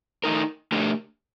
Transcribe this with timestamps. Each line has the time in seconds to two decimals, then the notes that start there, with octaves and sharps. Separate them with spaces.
0.24 A3 D#4 A#4
0.72 A3 D4 G4 A#4